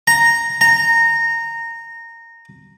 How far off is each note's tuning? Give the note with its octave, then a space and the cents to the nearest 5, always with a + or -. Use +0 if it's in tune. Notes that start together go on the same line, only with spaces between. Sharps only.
A#5 -5
A#5 -15